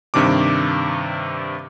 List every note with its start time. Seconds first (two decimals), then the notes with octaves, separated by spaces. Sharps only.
0.14 G2 C3 D#3 D4 D6